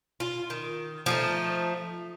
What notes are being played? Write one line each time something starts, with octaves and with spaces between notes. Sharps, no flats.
F4
D#3
F3 A3 D#4